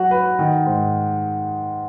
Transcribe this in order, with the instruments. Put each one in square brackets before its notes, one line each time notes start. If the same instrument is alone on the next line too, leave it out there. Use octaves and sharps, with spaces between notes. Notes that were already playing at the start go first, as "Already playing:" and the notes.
Already playing: [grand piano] F#3 F#4 [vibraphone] F#5
[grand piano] B4
D#3
G#2